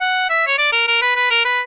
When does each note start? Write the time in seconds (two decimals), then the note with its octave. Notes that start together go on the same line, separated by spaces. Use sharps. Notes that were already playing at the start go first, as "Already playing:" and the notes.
0.01 F#5
0.30 E5
0.47 C#5
0.58 D5
0.73 A#4
0.88 A#4
1.02 B4
1.16 B4
1.31 A#4
1.45 B4